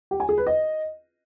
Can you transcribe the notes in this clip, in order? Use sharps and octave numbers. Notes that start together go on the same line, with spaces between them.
G4
G#5
G#4
B4
D#5